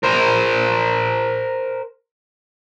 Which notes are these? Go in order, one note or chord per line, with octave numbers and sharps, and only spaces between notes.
A#4 C5